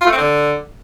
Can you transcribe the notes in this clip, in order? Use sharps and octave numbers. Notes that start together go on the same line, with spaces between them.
F4
A3
C4
D3